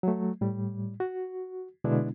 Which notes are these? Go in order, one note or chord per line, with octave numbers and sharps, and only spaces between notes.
F#3 A3
A2 G3
F#4
B2 D3 G#3 B3 D4 E4